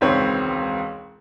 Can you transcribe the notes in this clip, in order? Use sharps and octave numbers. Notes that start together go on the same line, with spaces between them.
E1 C#2 D#3 C4 B4 C#5